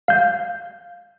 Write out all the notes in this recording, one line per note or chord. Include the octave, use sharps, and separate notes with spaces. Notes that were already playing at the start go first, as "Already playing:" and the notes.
F5 G6